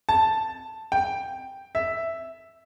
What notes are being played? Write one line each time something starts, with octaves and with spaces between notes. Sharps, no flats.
A5
G5
E5